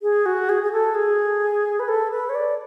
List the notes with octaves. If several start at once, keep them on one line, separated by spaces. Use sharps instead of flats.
G#4
F#4
G#4
G#4
A4
G#4
B4
A4
B4
C#5
D5